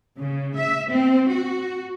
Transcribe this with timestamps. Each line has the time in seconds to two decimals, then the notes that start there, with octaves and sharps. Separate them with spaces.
0.20 C#3
0.57 E5
0.91 C4
1.30 F#4